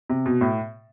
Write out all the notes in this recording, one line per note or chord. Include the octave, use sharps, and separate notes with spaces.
C3
B2
A2